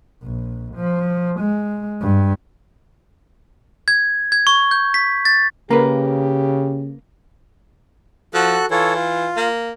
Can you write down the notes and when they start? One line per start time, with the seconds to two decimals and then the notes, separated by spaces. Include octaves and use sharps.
0.23 A#1
0.75 F3
1.40 G#3
2.02 G2
3.88 G#6
4.32 G#6
4.47 C#6
4.71 G6
4.94 B6
5.25 A6
5.71 C#3 A#3 G4 A#4 B4 A#5
8.34 F3 F#4 A4 F#6
8.71 E3 F4 A4 C#5
8.95 F4
9.37 A#3